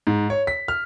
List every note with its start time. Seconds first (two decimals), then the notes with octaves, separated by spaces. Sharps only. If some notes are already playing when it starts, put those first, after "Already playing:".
0.07 G#2
0.30 C#5
0.47 B6
0.68 F6